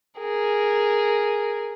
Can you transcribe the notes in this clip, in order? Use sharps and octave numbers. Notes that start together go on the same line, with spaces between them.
G#4 A#4